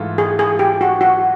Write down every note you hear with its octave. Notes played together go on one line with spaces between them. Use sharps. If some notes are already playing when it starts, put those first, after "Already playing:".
Already playing: G#2 E3 A3 F4
G#4
G#4
G4
F#4
F#4